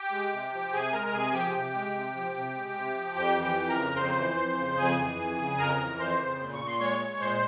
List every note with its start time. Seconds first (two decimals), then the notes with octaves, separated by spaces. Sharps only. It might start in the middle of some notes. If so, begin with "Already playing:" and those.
Already playing: G4 G5
0.12 G#3
0.33 C3
0.53 F3
0.72 C3 G#4 G#5
0.93 G#3 A#4 A#5
1.07 A#5
1.13 C3 G#4 G#5
1.33 F3 G4 G5
1.54 C3
1.75 G#3
1.95 C3
2.15 F3
2.35 C3
2.55 G#3
2.75 C3
2.95 F3
3.15 F2 G4 G5
3.36 E3
3.43 G4 G5
3.57 F2
3.69 A#4 A#5
3.76 C#3
3.96 F2 C5 C6
4.17 E3
4.37 F2
4.57 C#3
4.77 F2 G#4 G#5
4.98 E3
5.19 F2
5.38 C#3
5.58 F2 A#4 A#5
5.78 E3
5.99 F2 C5 C6
6.19 C#3
6.39 A#2
6.53 C#6
6.60 A#2
6.67 C6
6.80 G#3 C#5 C#6
7.00 G#3
7.20 A#2 C5 C6